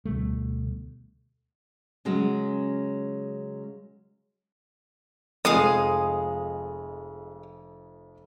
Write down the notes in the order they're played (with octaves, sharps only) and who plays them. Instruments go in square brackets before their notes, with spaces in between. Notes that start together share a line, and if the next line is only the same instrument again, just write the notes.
[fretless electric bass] D2 B2 G3 A3
[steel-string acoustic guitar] C#3 F#3 G#3 C#4
[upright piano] F1 F2 [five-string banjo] G#3 [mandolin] F5 G#5 D#6